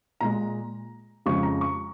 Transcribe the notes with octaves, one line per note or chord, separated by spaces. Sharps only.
A#2 G#3 A#5
F2 C#3 F3 G#3 C#6
A#5
C#6